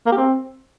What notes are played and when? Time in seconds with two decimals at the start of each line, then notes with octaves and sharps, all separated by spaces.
0.06 A#3
0.12 G4
0.17 C4